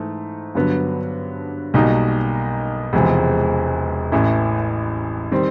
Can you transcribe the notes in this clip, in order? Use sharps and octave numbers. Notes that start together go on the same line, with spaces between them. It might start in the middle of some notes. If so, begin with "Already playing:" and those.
Already playing: G#2 E3 A3
G2 D3 F#3 B3
B1 B2 G3 A#3 D#4
E1 E2 C3 F3 G#3
A1 A2 E3
D#3 G3 C4